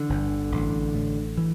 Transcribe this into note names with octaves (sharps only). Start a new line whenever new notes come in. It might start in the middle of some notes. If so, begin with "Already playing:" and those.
Already playing: D3 E3
G1
A1
A2
E3